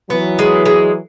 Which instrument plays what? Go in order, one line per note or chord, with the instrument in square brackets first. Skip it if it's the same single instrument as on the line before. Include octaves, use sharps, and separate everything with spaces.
[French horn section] E3 F#3 [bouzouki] B3
[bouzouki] G#3
G#3